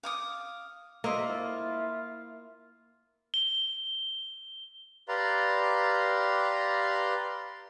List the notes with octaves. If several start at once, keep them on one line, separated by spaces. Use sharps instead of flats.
F5 D6 D#6
D2 A#3 C5 D#5 E5
E4 F4
G7
G4 B4 D5 F5 A#5 C6